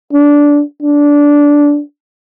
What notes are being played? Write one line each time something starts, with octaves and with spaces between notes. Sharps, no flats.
D4
D4